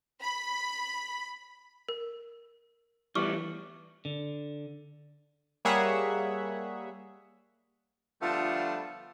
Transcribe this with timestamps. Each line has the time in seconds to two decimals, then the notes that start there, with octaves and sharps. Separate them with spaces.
0.23 B5
1.89 A#4
3.15 E3 G3 A3 B3 C#6 D6 F6
4.05 D3
5.65 G3 A#3 G#4 C#5 E5 F#5
8.21 D3 F3 G3 A3 B3 F4